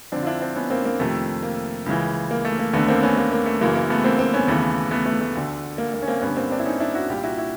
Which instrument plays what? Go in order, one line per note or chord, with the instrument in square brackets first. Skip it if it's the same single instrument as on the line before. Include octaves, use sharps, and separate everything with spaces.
[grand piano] F2 D3 C4 D4
F4
D4 E4
C4 D4
B3 C#4
A#3 C4
A#3
F2 C3 D#3 A3
A#3
C#2 C#3 E3
A#3
A3
A#3
D#2 D3 A3 B3
A#3 C4
B3 C#4
A#3
A#3
A3
F#2 C#3 E3 A#3
A#3
A3 B3
A#3 C4
A#3 C4
B3 C#4
D#2 C#3 E3 A3 B3
A3 B3
A3 B3
A3
D2 D3
A#3
A#3
C#4
A#3 C4
G2 D3 B3 C#4
A#3 C4
C4 D4
E4
C#4 D#4
D4 E4
E4 F#4
C2 A#2 F4 G4
E4 F#4
E4 F#4